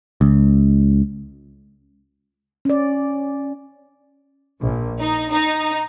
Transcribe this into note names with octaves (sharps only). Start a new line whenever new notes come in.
C#2
C#4 D5
A#1
D#4
D#4